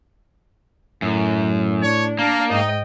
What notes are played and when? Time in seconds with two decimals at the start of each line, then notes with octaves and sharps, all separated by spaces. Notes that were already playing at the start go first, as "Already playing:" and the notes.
1.02 F#2 A2
1.82 D4 C#5
2.19 A#3 D4 A#4
2.50 G#2 D#4 D#5 G5